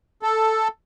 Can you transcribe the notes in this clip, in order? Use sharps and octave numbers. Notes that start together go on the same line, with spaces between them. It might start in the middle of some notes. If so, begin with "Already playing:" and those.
A4